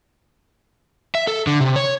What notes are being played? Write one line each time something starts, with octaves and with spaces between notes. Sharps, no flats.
E5
A4
D3
C3
C#5